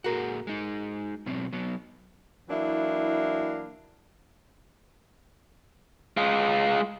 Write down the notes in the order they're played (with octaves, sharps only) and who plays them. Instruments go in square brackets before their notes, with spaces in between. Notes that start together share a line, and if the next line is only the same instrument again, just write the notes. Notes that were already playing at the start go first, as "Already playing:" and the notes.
[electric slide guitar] A#2 G#4 F#5 [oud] F#4 A#4
[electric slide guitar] G#3 D#4
B2 F#3 C4
F#3 B3
[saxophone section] E3 F#3 A#3 D4 E4
[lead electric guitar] G#3 F4